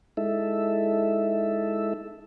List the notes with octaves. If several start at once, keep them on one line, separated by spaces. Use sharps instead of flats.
G#3 D#4 E4 A4 E5